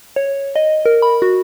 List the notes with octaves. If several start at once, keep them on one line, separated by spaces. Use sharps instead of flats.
C#5
D#5
A#4
B5
F#4